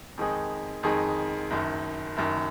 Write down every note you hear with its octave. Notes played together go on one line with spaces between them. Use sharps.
F2 D#3 G#3 D#4 G#4
F2 D#3 G#3 D#4 G#4
F#1 F#2 D#3
F#1 F#2 D#3